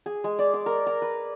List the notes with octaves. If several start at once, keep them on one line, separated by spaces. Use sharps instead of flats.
G#4
G#3
D5
D6
A#4
A#5
B4